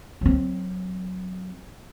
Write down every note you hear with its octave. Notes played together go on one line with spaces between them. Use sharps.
F#3 C4